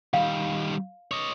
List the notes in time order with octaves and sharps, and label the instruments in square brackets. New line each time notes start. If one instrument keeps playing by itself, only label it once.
[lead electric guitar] D#3 G3 [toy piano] F5
[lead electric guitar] C#5 D#5